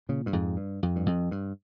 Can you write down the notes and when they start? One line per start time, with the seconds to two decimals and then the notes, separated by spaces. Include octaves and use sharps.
0.09 A#2 C#3
0.26 G2
0.33 F2 G#2
0.57 G2
0.83 F2
0.96 G2
1.06 F2
1.31 G2